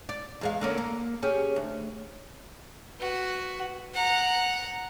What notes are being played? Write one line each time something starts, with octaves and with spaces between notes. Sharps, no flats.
D5
E2 G#3 F5
D3 A#3 C#4
A#3
C#4 G4 G#4
D2
F#4 B4
F#5 A#5